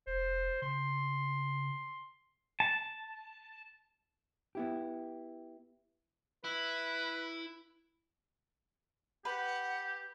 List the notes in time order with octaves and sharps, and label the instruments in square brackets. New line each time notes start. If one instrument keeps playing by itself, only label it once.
[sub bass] F1 [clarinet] C5
[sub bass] C#3 [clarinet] C6
[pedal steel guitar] A5
[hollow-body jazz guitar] B3 E4 G4
[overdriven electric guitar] E4 [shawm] B4
[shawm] G4 [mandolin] B4 [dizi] F#5